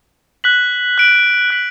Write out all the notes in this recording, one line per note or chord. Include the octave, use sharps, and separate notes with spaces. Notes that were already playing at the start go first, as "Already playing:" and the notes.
F#6 B6 F#7
F#6 D7 F#7
F#6 B6 F#7